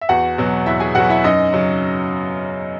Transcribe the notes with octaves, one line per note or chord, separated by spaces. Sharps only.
E5
E2 F#4 F#5
B2 F#3
E2 E4 E5
G#4 G#5
B2 F#3 F#4 F#5
E4 E5
F#2 D#4 D#5
C#3 F#3